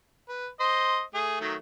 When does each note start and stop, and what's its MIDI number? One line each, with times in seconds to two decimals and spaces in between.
0.29 0.47 71
0.60 1.02 72
0.60 1.02 75
1.14 1.39 57
1.14 1.39 68
1.40 1.55 51
1.40 1.55 54
1.40 1.55 57